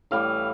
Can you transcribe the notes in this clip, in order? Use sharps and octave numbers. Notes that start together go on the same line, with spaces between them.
A2 E3 G3 F5